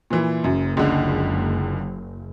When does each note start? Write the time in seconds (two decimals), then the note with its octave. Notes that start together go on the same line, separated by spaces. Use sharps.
0.10 A#2 E3
0.44 F#1 F#2
0.77 C#2 D3